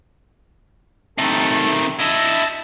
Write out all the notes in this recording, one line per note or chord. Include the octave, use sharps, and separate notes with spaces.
C3 D#3 A3 A4
E4 D#5 A5 E6 A#6